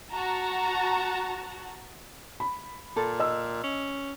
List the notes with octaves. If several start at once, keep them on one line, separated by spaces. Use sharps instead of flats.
F#4 A5 A#5
B5
A#2 A4
D#5 E6
C#4